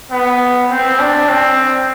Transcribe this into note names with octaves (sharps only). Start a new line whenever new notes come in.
B3
C4
D4
C4